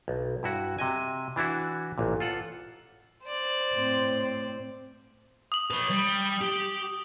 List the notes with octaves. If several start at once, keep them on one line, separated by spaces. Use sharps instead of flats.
B1
G2 E4 F#4
C3 D#5 G#5
E3 D4 E4 F#4
A1 A#2
F4 A4 F#5
C5 D5
A2 C4
D#6 F#7
B4 C#5
G3
G4